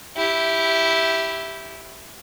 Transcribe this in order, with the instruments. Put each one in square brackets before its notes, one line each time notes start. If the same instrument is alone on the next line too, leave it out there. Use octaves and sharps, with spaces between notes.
[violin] E4 G4